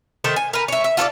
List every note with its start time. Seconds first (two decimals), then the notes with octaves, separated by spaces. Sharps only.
0.24 D#3 A3 A4 C5
0.36 G#5
0.53 A#4 B4
0.68 C#5 E5
0.84 E5
0.97 F4 A4 C#5 D5